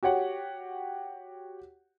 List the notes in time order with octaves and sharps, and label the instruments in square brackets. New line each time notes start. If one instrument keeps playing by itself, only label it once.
[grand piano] F#4 G4 C#5 F#5